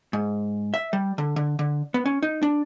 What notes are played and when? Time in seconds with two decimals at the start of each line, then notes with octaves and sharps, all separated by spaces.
0.13 G#2
0.74 E5
0.93 G3
1.18 D3
1.36 D3
1.59 D3
1.94 B3
2.06 C#4
2.23 D#4
2.43 D4